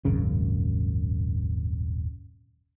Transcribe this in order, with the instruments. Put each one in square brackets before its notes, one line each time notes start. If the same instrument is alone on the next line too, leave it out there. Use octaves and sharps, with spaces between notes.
[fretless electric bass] D#1 G#1 F#2 C#3